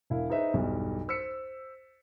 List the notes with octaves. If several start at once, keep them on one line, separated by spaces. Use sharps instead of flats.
E1 E4 F5
D#4 G#4 B4 C5 D#5 E5
B1 E2 G2
C5 E6 B6 C#7